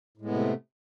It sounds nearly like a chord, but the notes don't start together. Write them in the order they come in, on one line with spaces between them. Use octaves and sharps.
A2 G#3 B3 C3 A3